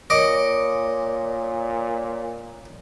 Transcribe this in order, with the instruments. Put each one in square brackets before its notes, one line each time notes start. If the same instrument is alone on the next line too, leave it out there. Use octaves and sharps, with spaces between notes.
[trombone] A#2 [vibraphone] A#4 C#5 [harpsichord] D#5 D6